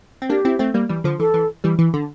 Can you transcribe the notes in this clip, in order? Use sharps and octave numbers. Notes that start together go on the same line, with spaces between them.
C4
A#3 D4 G4
C4 E4
A3 C4
G3 A#3
E3 G3
D3 F3
E3 A4
E3
E3 G3
E3
D3